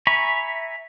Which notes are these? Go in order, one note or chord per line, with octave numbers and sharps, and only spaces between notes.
E5 G#5 A#5 B5 C#6